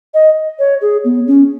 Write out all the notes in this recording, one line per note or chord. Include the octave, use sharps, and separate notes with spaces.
D#5
C#5
G#4
B3
C#4